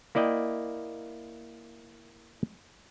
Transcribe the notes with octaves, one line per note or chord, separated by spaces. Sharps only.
A#3 E4 D5 D#5 G5